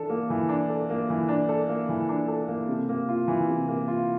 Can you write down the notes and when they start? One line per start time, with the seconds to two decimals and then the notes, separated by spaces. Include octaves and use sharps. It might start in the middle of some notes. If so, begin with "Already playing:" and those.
Already playing: E3 D4 A4
0.10 A#3
0.30 E3
0.49 D4
0.70 A4
0.90 A#3
1.10 E3
1.29 D4
1.49 A4
1.69 A#3
1.89 E3
2.09 D4
2.28 A4
2.48 A#3
2.68 C3
2.89 A#3
3.09 F4
3.28 E3
3.48 C3
3.68 A#3
3.88 F4